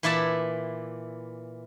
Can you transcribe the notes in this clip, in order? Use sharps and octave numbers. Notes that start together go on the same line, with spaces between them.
A#2 E3 E4 D5 A5 B5